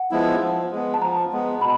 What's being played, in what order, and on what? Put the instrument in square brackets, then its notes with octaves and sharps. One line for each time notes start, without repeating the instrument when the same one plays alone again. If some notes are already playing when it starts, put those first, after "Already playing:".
Already playing: [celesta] F#5
[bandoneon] F3 G#3 B3 E4
F3
G#3 B3
[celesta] A5
[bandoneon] F3 [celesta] A#5
[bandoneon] G#3 B3
[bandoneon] B2 [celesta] B5